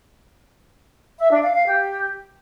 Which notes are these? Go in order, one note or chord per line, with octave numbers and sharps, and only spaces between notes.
E5
D4
F5
F5
G4